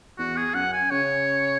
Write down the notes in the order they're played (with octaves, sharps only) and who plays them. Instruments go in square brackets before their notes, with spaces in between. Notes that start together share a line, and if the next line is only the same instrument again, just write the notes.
[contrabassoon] E2 [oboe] F#4
[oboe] G#4
[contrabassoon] F#2 [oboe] F#5
[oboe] G#5
[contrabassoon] C#3 [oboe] C#5